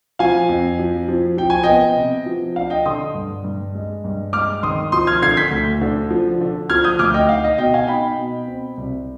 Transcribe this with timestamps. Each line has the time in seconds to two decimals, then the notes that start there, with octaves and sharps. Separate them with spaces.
0.19 F3 F5 G#5
0.49 F2
0.79 F3
1.08 F3
1.37 F3 G5
1.50 G#5
1.63 B3 D#5 G5
1.96 C3
2.26 F3
2.56 D4 F5
2.70 D#5 G5
2.86 D3 C6 D#6
3.14 G2
3.44 G2
3.75 G#3
4.04 G2
4.33 G#3 D6 F6
4.63 D#3 C6 D#6
4.92 F3 C6 D#6
5.07 F6 G#6
5.22 D3 G#6 C7
5.37 G6 B6
5.51 D2
5.81 D3
6.10 F3
6.41 D3
6.70 F3 F6 G#6
6.84 D#6 G6
6.99 D2 D6 F6
7.14 D#5 G5
7.29 D#4 F5
7.44 D#5
7.58 B2 D#5 G5
7.74 F5 G#5
7.87 D#4 G5 B5
8.18 B2
8.47 C4
8.77 C2